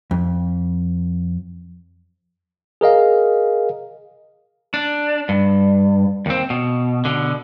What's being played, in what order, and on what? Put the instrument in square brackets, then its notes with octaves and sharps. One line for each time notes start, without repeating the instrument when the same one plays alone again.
[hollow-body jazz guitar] F2
[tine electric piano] G#4 A#4 D#5 F5
[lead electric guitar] D4
G2
D#2 C4
B2
B2 D3